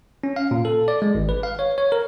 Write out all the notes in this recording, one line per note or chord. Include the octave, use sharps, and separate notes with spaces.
C#4
F5
A#2
A4
D5
G#3
G#1
B4
F5
C#5
C#5
A#4